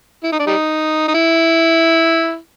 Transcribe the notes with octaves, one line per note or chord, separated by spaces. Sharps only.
E4
D#4
D4
G3 D#4
D#4
E4